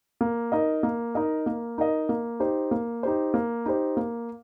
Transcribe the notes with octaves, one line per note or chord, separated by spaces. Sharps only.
A#3
D#4 A#4 D#5
A#3
D#4 A#4 D#5
A#3
D#4 A#4 D#5
A#3
D#4 G4 C5
A#3
D#4 G4 C5
A#3
D#4 G4 C5
A#3